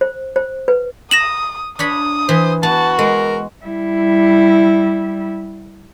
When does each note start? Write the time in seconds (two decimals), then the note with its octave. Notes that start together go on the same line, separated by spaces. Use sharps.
0.01 C5
0.36 C5
0.68 B4
1.11 D#6 A#6 E7 F#7
1.79 D4 C#5 B5 D#6
2.29 E3 C5
2.63 B3 F#4 A5
2.99 G#3 A#4
3.65 G3 E4